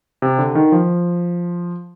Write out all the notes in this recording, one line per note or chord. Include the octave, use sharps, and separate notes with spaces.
C3
D3
D#3
F3